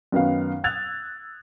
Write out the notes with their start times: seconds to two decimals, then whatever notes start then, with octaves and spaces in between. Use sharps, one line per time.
0.12 F#2 D#3 B3 F5
0.64 D#6 E6 F#6 G#6 A6 F7